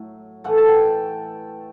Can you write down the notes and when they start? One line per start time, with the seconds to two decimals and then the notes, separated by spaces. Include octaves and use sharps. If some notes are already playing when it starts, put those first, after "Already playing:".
Already playing: A2 F#3
0.44 A2 E3 A3 F#5
0.58 A5
0.69 G5